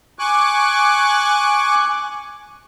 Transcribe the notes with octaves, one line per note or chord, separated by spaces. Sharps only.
G#5 C#6 D6 F#6